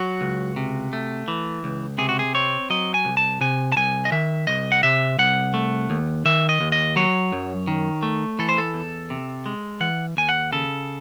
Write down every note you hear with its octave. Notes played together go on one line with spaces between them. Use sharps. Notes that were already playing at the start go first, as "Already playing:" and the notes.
Already playing: F#3 F#4
C#2
C3
A3
E3
C#2
C3 G#4
F#4
G#4
C4 C#5
F#3 D#5
G#5
C2
A5
C3 G#5
A5
C2 G#5
D#5
D#3 E5
C2 D#5
F#5
C3 E5
C2 F#5
A3
D#2
D#3 E5
D#5
D#2
D#5
F#3 C#5
F#2
D#3
A3
E3 A4
C5
A4
E2
C3
G#3
E3 F#5
D#2 G#5
F#5
C#3 A4